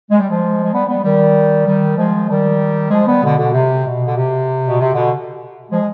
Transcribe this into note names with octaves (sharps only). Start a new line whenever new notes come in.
G#3
G3
F3 G#3
G#3
G3 B3
G3 B3
D#3 G3
D#3 G3
F3 G#3
D#3 G3
F3 G#3
G3 B3
B2 D3
B2 D3
C3
B2
D3
C3
B2
C3
B2 D3
F3 G#3